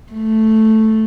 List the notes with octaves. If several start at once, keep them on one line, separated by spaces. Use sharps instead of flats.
A3